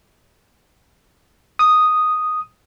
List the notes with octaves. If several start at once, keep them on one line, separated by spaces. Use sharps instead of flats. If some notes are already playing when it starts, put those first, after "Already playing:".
D#6